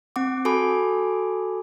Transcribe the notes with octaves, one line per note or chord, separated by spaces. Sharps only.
C4 F#5 D6
F#4 A4 G#5 B5 D6